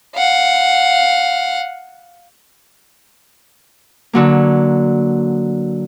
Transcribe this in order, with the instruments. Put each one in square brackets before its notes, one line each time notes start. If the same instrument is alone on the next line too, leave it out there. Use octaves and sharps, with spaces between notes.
[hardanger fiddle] F5 F#5
[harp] D3 F#3 A#3